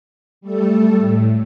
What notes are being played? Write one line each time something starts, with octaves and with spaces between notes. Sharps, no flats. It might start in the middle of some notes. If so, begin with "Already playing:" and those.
G3 A3 A4
A2